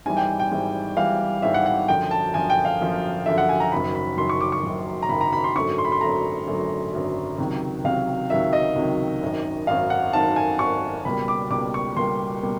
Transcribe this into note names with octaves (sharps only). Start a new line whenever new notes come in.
G#1 G#2 E3 G3 G#5
G5
G5
G#1 G#2 E3 G3
G#1 G#2 E3 G3 F5
G#1 G#2 E3 G3 E5
F#5
F#5
F#2 D3 F3 G5
A5
F#2 D3 F3 G#5
G5
F5
F#2 D3 F3
F#2 D3 F3 E5
F#5
G#5
A#5
F#1 F#2 D#3 F#3 B5
B5
F#1 F#2 D#3 F#3 C6
C#6
D6
C#6
F#1 F#2 D#3 F#3
A#5
F#1 F#2 D#3 F#3 B5
A#5
B5
C6
G#1 F#2 D3 F#3 A3 C#6
C6
B5
C6
G#1 F#2 D3 F#3 A3 A#5
G#1 F#2 D3 F#3 A3
G#1 F#2 D3 F#3 A3
C#2 C3 D#3 F#3
C#2 C3 D#3 F#3 F5
C#2 C3 D#3 F#3 E5
D#5
C#2 C3 D#3 F#3
G#1 F#2 D#3
G#1 F#2 D#3 F5
F#5
G#1 F#2 D#3 A5
G#5
G#1 F#2 D#3 C#6
C#2 B2 G3 A#3 B5
D6
C#2 B2 G3 A#3 D6
C#6
C#2 B2 G3 A#3 C6
B2 G3 A#3